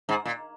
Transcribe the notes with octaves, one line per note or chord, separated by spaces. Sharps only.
G#2
A#2